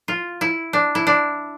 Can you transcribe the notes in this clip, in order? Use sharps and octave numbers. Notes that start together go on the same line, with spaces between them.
F4
E4
D4
E4
D4